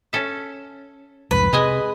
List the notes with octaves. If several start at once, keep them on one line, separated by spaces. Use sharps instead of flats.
C#4 A4 E5
C2 F2 G#2 B4
C3 G#3 D#5 G#5